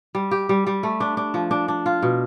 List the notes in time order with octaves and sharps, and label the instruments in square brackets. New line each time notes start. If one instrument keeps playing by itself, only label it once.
[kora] G3
G4
G3
G3
A3
D4
D4
F3
D4
D4
F4
B2